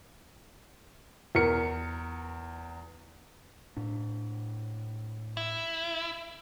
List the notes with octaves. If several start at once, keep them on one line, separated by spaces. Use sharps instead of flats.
E2 A#4 C#7
A2 D4
E4